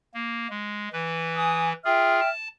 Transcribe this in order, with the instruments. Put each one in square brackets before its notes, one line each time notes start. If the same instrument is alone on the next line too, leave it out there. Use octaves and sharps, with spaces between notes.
[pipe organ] A#3
G#3
E3 B4
[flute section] G#5 D#6
[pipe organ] F4 G#4 [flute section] E5 G5 F6
[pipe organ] A5